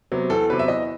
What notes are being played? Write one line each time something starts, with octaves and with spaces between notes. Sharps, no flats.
C3 F#3 B3
E2 A4
C3 F#3 B3 B4
E5
E2 D#5